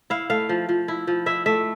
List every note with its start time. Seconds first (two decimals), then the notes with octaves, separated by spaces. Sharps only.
0.10 E4 F5
0.30 A3 F5
0.49 F3
0.69 F3
0.88 E4
1.07 F3
1.26 E4 E5
1.46 A3 E5